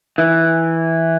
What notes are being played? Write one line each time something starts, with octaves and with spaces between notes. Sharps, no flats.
E3